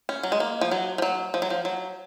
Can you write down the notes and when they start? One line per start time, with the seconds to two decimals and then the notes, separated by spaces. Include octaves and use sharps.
0.09 C#4
0.23 F#3
0.32 G#3
0.40 A#3
0.61 F3
0.71 F#3
0.98 F3
1.02 F#3
1.34 F3
1.42 F#3
1.50 F3
1.65 F#3